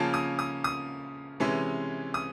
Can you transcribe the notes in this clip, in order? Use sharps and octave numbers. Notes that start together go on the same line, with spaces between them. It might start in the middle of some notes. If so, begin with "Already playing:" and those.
Already playing: C#3 F3 A#3 C#4 F4 A5
D#6
D#6
D#6
C3 E3 G#3 C#4
D#6